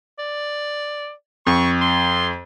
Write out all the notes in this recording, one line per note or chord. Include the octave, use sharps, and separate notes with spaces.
D5
F2 C#6
C6